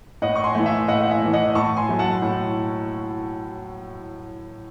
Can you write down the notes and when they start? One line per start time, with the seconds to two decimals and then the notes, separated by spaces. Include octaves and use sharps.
0.22 A2 D#5 F#5
0.36 C#6
0.44 G#5 C6
0.55 E3 A3
0.66 E5 G#5
0.88 A2 D#5 F#5
1.01 F#5
1.10 E5 G#5
1.22 E3 A3
1.33 D#5 F#5
1.55 A2 A5 C#6
1.77 G#5 C6
1.89 F#3 A3
1.99 F#5 A5
2.22 A2